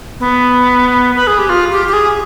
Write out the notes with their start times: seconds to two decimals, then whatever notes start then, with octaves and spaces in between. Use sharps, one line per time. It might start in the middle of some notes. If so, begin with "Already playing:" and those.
0.20 B3
1.16 B4
1.27 G#4
1.38 G4
1.49 F4
1.72 G4
1.88 G4
1.93 G#4